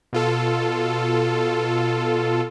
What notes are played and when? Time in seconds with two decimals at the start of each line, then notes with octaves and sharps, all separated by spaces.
0.13 B2 F4 A4